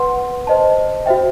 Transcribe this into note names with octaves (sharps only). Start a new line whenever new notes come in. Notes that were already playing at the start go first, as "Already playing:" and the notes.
Already playing: B4 F#5 C6
C5 D#5 A5
F#4 C5 E5 G5